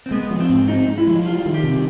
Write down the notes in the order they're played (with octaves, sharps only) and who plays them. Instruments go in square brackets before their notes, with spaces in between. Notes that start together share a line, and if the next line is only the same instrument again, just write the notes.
[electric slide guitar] C4
[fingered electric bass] G#3 [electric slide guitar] B3
[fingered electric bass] F3
[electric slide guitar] C4
[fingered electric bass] G#2
[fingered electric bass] C4 [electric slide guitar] D#4
[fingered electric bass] G#3
[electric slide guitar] E4
[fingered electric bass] F3
[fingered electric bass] G3 [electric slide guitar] F4
[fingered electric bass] D#3
[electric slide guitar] G4
[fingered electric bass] C3